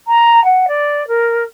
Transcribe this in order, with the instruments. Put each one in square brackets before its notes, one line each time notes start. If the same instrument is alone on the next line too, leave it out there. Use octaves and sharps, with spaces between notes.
[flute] A#5
F#5
D5
A#4